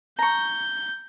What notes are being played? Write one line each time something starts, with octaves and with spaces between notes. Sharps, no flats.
A#5 C#6 G6